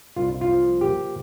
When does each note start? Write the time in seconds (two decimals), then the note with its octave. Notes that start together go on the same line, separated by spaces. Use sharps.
0.16 C2 F4
0.41 F4
0.49 F3
0.81 A#3 G4